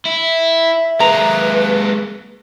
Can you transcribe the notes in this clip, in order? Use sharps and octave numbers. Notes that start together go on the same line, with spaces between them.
E4 E5
G#3 A#3 B4 A#5